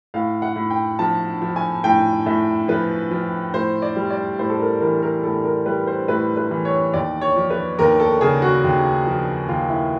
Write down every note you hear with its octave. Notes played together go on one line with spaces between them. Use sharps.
A2 F5
F#5
A2
G5
F3 A5
F3
G#5
A2 G5
A2 E5
F3 B4
F3
A2 C5
D5
G3
D5
A2 C5
A4
A#4
E3 A#4
A#4
A2 A4
A#4
G3 B4
C5
A2 B4
B4
E3
C#5
D#2 D5
C#5
F3
B4
D#2 A#4
A4
C#3 G#4
F#4
D#2
F3
D#2 F4
E4